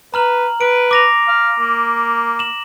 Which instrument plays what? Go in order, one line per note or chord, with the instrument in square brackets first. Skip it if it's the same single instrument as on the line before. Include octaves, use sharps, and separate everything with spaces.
[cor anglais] B4 [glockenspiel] A#5 F6 F#7
[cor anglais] B4 [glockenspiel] D7
[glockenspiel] D6 A#6 F7
[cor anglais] F5
A#3
[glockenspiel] E7 F#7